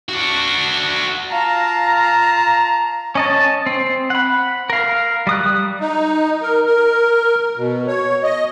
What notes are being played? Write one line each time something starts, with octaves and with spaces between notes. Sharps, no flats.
D4 F#4
F4 F5 A5 A#5
C#4 D#5 A5
C4
F#5 B5
A#4 F5
G3 D#6 F#6
D#4
A#4
A#4
B2
C#5
D#5